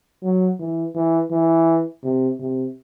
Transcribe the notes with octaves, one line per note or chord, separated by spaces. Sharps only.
F#3
E3
E3
E3
C3
C3